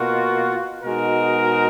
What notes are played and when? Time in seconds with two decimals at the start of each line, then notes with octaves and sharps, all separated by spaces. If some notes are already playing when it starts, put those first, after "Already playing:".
Already playing: B2 A#3 F4 F#4
0.83 B2 G#3 D#4 F#4 A#4